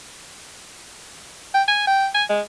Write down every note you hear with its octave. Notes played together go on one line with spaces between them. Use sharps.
G5
G#5
G5
G#5
G#3